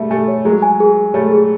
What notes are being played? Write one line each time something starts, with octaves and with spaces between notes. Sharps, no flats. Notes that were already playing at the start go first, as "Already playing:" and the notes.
Already playing: G3 A3 G#4 E5
G3 A3 G#5
C#5
F#3 G#3 G#4
G#5
G#4
G#4
G3 A3 C#5
G#4